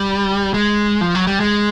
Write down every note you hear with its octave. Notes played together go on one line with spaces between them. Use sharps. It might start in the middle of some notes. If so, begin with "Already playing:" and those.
Already playing: G3
G#3
F3
F#3
G3
G#3